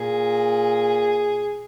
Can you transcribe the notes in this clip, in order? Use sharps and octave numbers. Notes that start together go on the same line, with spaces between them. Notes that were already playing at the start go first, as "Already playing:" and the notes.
Already playing: A#2 G#4